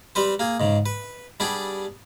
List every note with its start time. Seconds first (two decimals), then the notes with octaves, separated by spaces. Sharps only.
0.15 G3 C4 B4 C5
0.39 A#3 G#4
0.60 G#2 C#3
0.86 B4
1.40 G3 B3 D4 G4 G#4